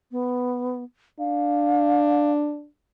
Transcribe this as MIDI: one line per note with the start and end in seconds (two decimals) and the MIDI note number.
0.11 0.84 59
1.19 2.67 62
1.19 2.31 77